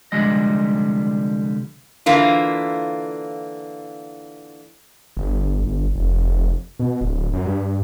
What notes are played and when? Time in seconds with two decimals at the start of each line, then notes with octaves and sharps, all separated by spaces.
0.12 C2 D3 F3 G3 G#3 D#5
2.06 D3 E3 A#3 F4
5.17 G1
5.66 G1
5.96 F1
6.80 B2
7.01 D1
7.33 F#2
7.46 G2